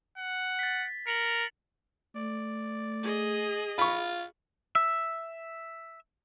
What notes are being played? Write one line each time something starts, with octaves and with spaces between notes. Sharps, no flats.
F#5
A6 B6
A#4 C#7 F7 F#7
A3 D5
G#4 D#5
F4 B5 C#6
E5